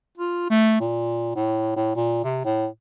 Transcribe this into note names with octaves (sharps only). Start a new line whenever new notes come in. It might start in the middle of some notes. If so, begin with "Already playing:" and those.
F4
A3
A#2
A2
A2
A#2
C3
A2